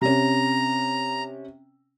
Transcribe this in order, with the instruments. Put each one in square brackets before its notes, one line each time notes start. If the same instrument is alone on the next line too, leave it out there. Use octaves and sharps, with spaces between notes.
[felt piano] C3 C#4 [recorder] A#5